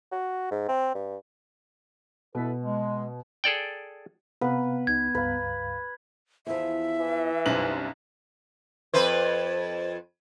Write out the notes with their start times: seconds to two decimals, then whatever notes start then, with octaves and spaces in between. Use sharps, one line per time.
0.12 F#4
0.51 G#2
0.68 C4
0.95 G2
2.35 B2 E4 A4 B4
2.61 G#3
3.44 G#4 A4 D5 G5
4.41 C3 B3 B4 F5
4.87 C#2 D#4 G#6
5.15 C#2 G2 B4 F5
6.47 E2 F3 E5
7.00 E3
7.46 B1 F#2 G3 C4 D4 F#7
8.94 F2 B4 C5